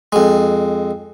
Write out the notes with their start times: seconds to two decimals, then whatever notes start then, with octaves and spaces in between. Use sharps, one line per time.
0.13 F2 G#3